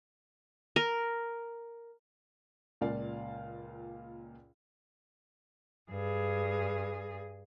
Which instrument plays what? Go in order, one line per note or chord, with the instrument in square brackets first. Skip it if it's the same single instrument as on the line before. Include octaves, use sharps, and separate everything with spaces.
[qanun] A#4
[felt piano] C#2 A#2 D5 F5
[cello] G2 G#4